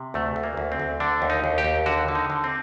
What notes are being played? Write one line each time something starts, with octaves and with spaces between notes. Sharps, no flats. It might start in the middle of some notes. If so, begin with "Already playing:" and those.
Already playing: C3
D2 A3
D2
A#3
D2
C4
D2
D3 D4
D#2
D#4
D#2
G4
D#2
D3 F#4
D3
D#4
D3
C4